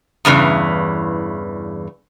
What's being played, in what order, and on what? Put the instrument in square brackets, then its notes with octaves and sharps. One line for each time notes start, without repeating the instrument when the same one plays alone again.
[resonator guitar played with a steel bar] E2 G2 C#3 E3